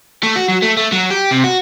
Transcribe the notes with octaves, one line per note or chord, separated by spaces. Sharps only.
A3
F#4
F#3
A3
A3
F#3
G4
C3
F#4